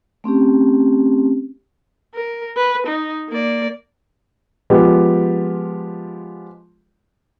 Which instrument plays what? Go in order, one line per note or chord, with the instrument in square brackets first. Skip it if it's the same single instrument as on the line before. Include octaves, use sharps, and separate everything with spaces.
[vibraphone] A3 C4 C#4 G4
[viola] A#4
B4
D#4
A#3 D5
[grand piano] F3 G#3 B3 G4